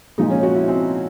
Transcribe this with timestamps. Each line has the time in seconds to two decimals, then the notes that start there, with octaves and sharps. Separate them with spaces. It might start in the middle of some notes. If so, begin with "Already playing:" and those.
0.18 A#2 F3 G#3 D#4
0.30 C#4
0.43 F#4
0.55 E4
0.68 C4